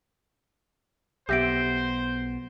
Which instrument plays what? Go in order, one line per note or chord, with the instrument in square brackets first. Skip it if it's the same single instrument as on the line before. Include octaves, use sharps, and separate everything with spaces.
[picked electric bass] B1 B3 [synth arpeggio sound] G4 E5 [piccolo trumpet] C5 [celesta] G6 A#6 D7